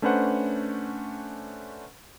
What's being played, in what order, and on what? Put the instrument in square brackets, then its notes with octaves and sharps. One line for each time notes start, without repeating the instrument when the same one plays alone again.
[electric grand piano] A3 C#4 D4 B4 C5 F#5